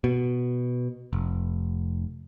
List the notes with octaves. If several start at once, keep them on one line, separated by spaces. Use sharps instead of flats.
B2
F1